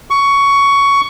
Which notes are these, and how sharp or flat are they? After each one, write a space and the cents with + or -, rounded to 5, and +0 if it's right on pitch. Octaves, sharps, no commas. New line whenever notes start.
C#6 +15